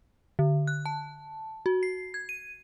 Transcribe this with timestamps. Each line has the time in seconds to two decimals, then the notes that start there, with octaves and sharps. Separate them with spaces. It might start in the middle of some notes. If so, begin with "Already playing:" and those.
0.39 D3
0.67 F#6
0.86 A5
1.66 F#4
1.83 C7
2.14 G#6
2.29 D#7